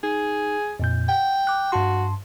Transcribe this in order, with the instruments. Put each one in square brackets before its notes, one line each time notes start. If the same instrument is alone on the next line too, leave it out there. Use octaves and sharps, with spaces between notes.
[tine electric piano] D#4 [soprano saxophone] G#4
[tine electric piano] F2 A#2 G6
[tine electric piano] F#5 [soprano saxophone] G5
[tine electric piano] D6 F#6
[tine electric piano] G2 A5 C6 [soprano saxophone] F#4